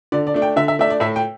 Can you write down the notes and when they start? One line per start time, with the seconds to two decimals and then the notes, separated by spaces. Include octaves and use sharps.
0.12 D3 D5
0.27 D5
0.34 A3 D4
0.42 G5
0.56 D3 E5
0.68 E5
0.79 A3 D4 E5
0.90 D5
1.00 A2 E5
1.16 G5